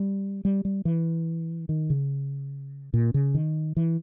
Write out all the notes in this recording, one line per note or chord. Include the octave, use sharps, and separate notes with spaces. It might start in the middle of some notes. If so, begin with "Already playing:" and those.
Already playing: G3
G3
G3
E3
D#3
C#3
A#2
C#3
D#3
E3